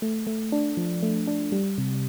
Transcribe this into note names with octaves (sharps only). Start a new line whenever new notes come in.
A3
A3
D4
F3
A3
D4
G3
C3